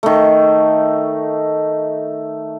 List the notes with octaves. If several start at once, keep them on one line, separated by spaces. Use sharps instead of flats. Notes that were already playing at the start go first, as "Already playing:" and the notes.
D#3 A3